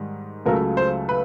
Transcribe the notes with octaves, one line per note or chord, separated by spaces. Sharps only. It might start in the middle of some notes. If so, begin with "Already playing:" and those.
Already playing: G#2 D#3 G3
C#2 C#3 F#3 A3 A#4
C5
B4